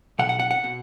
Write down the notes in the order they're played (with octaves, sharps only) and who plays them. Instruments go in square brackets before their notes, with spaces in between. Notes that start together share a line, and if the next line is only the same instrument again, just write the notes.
[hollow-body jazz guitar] B1 B2 F#5
F#5
F#5
F#5
B2